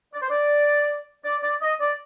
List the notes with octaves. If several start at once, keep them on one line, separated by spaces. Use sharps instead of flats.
D5
C5
D5
D5
D5
D#5
D5